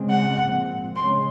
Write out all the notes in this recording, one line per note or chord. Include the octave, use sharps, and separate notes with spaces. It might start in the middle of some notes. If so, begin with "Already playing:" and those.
Already playing: C#3 G#3 C4
F#5
A#2 F3 C4
C#3 G#3 C#4 C6